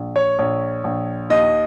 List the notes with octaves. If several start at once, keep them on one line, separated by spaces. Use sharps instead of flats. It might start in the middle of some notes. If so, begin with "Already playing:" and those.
Already playing: A#1
C#5
A#1 C#5
A#1
D#2 D#5